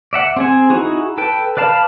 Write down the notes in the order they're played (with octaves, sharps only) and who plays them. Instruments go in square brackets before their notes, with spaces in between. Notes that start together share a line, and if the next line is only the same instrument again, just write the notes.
[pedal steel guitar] D5 E5 F#5
C4 G#4 G#5
D#4 E4 F#4 G#4
A4 B4 G5
B4 D5 F5 A5 B5